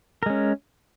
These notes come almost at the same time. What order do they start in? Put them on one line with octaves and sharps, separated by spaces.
A#4 G#3 C#4